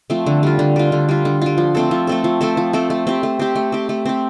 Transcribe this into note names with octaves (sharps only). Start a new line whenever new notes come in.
F3 A3 C4
D3
G3 F4
D3
G3 F4
D3
G3 F4
D3
G3 F4
F3
A3 C4 A4
F3
A3 C4 A4
F3
A3 C4 A4
F3
A3 C4 A4
A3
C4 G4
A3
C4 G4
A3
C4 G4
A3
C4 G4